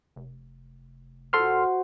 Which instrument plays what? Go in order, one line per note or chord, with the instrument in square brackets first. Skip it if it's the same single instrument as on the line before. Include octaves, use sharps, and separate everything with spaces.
[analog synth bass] F1
[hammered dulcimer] F#4 C5 [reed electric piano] A4 C6 F6